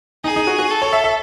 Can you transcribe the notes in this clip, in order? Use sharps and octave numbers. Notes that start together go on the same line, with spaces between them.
D#4 G#4
D#4
F#4
F#4
A4
C#5
E5
E5